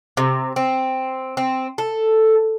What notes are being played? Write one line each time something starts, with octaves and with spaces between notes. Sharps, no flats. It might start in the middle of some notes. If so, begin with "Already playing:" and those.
C3
C4
C4
A4